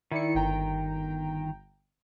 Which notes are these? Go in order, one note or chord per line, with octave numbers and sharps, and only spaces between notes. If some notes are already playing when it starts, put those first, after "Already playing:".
D#3 E4 D5 C#7
G1 G5 A#5